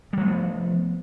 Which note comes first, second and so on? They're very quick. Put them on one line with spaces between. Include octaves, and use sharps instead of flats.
G3 F3 A3 B3